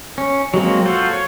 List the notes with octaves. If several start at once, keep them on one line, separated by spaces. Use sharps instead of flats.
C#4
F#3 G#3 A#3 C4
F4 F#4 A4 C5
C#5